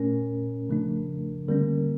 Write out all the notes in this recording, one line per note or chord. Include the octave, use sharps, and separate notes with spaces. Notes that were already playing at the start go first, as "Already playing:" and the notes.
Already playing: A#2 A3 C#4 A#4
C#3 F3 A3 D4
D3 G3 A#3 C#4 A#4